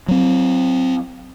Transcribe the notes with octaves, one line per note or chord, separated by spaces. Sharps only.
F#3 C4